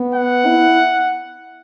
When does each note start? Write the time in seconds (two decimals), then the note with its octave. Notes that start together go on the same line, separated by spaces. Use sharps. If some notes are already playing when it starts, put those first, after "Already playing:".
Already playing: B3
0.15 F#5
0.46 E4